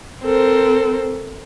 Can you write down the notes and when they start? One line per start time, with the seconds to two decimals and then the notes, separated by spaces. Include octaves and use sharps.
0.22 C4 A4 A#4 C5